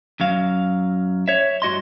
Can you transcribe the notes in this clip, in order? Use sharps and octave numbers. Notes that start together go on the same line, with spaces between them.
F#2 F#3 F5
C#5 E5
G2 F#4 D#5 C6